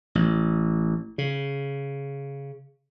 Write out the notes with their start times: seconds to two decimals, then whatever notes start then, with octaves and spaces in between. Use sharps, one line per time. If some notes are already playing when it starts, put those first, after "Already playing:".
0.15 A1
1.18 C#3